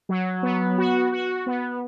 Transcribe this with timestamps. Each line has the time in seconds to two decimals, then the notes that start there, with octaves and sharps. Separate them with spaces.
0.09 F#3
0.43 B3
0.78 F#4
1.12 F#4
1.46 B3